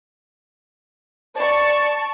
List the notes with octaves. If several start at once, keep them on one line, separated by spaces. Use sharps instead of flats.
D5 A5 C#6